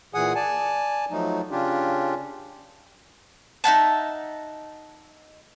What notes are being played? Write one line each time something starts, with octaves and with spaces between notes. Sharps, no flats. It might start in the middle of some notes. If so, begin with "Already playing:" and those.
A#2 E3 G#4 F#5 G#5 D#6
D5 G#5 A5
F3 F#3 A3 D#4
C#3 C#4 D4 F4 G4
D#4 E5 F#5 A5